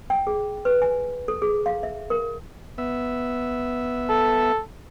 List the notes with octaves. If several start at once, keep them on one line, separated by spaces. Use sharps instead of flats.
G5
G#4
B4
G#5
A4
G#4
F5
E5
A#4
B3 E5
A4